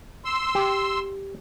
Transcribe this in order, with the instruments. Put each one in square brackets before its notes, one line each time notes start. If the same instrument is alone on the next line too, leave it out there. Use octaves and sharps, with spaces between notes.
[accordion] C6 E6
[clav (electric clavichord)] G4